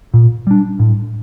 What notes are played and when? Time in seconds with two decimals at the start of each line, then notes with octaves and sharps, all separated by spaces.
0.14 A#2
0.47 G3 D4
0.79 A2